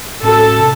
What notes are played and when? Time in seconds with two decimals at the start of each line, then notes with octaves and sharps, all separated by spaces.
0.23 A2 G#3 C#4 F#4 A4
0.59 C3